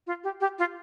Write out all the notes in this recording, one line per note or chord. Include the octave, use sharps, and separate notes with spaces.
F4
G4
G4
F4